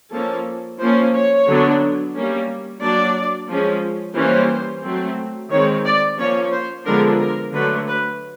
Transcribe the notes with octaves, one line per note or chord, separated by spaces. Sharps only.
F3 A#3 C#4 A4
F3 A#3 C#4 C5
C#5
D3 F#3 B3 D4
G3 A#3 C#4
F#3 A#3 D4 D5
F3 G#3 C#4
E3 G3 A#3 C#4 C5
F#3 A3 C4
D#3 G#3 C4 C#5
D5
F3 A#3 C#4 C#5
C5
D3 F3 G#3 B3 D4 A#4
A#4
D3 F#3 A3 B4
B4